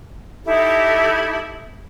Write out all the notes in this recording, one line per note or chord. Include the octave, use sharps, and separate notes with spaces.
D#4 E4 G4 A4